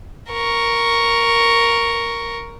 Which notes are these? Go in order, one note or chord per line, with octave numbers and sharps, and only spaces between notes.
A#4 C#6